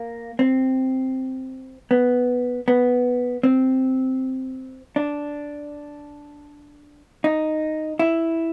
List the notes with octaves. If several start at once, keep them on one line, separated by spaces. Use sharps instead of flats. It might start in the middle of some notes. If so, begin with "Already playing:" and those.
Already playing: A#3
C4
B3
B3
C4
D4
D#4
E4